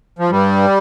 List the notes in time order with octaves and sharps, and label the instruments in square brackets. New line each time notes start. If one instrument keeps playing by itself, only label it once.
[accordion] F3
G2 G3